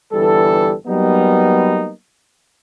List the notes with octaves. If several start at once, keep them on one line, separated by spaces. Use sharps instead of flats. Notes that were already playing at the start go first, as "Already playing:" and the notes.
G1 E3 G3 A4
F#3 G3 A#3 B3 D#4